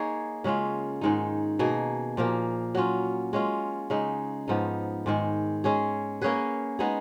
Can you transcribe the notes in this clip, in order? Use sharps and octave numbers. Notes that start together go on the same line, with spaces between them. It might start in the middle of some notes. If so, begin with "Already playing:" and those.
Already playing: A#3 D#4 G#4 C#5
C#3 G#3 C#4 F4
G#2 D#3 G#3 D#4
B2 A#3 D#4 G#4
A#2 F3 A#3
F#3 C#4 F4
G#3 C#4 F4
C#3 G#3 D#4
G#2 F3 B3 D#4
G#2 D#3 G#3
G#3 C#4 G#4
A#3 C#4 G#4 B4
G#3 B3 D#4 G#4